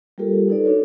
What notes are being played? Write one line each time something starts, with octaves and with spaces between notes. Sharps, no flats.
G3 A#3 F4 G4 A4 A#4
D#4 A4 B4 D5
D4 D#4 F#4 A4 C#5